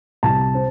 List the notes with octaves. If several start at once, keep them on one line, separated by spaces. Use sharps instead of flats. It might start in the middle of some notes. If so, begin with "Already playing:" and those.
C2 A5
C4